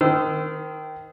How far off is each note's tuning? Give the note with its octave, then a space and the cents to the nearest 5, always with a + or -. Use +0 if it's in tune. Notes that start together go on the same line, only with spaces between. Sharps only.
D#3 +0 C5 -30 E6 +5